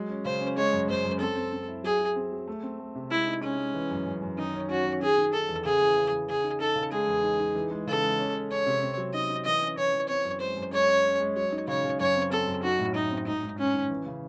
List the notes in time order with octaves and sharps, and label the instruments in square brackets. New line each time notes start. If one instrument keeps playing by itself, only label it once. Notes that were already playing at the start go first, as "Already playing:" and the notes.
Already playing: [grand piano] F#3 G#3
C#4
[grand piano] C#3 [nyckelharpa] C5
[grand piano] C#4
[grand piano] G#3 [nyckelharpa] C#5
[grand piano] F#2
[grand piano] F#2 [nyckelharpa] C5
[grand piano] F#2
[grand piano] C4 [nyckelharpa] A4
[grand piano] C4
C4
E4
[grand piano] F#3 [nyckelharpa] G#4
[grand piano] F#3
C4
F#3
A3
C4
A3
C3
[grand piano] G#3 [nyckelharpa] E4
[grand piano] D#4
[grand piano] G#3 [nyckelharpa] C#4
[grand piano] G#3
E3
F#2
F#2
F#2
[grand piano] D#3 [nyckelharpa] D#4
[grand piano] C#4
[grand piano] C#4 [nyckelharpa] F#4
[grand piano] C#4
[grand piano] D#3 [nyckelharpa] G#4
[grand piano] D#3
[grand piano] D#3 [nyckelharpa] A4
[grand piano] E2
[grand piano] C#3 [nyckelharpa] G#4
[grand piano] E3
C#3
E3
[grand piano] C#3 [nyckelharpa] G#4
[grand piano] D#4
[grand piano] D#4 [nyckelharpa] A4
[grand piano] C#3
[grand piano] G#3 [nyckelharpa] G#4
[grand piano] E2
D#4
D#4
E3
G#3
[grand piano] C#3 [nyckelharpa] A4
[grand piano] G#3
C#4
C#4
[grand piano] C#4 [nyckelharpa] C#5
[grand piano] C3
C4
F#3
[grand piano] D#4 [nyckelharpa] D#5
[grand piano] D#4
[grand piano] E3 [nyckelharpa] D#5
[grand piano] C#4
[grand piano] E3 [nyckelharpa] C#5
[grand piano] E3
[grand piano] C4 [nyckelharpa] C#5
[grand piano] F#2
[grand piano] G#3 [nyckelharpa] C5
[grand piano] F#2
[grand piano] G#3 [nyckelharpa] C#5
[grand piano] C#4
C#4
G#3
[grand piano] F#3 [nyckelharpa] C#5
[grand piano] D#4
[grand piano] C#3 [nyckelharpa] C#5
[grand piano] C#3
[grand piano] F#2 [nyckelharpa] C#5
[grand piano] C4
[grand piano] C4 [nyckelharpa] A4
[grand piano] F#2
[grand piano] D#4 [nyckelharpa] F#4
[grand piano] A2
[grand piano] A2 [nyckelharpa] D#4
[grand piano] C4
[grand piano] G#2 [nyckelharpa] D#4
[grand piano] G#2
[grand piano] G#2 [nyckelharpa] C#4
[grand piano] D#3
E3
C#3